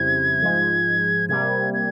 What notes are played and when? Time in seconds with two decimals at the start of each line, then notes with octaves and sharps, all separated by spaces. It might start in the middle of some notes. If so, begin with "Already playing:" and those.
Already playing: F2 C#3 G3 C4 E4 G#6
0.41 G#2 F3 G#3
1.29 C3 G3 A#3 G#6
1.74 G#6